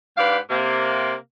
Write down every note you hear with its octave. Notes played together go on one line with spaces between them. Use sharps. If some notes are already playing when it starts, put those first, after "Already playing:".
G#2 D4 G4 B4 F5
C3 A#3